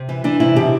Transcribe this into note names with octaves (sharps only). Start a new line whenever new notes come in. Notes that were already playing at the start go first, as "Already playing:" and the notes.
Already playing: C3
E3
E3 D4
C3 E4
B2 G4